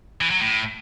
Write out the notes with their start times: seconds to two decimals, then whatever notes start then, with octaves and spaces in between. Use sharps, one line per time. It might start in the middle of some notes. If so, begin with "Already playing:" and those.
0.21 E3
0.30 F#3
0.40 A2